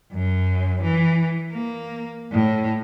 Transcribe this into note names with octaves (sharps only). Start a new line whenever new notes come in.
F#2
E3
A#3
A2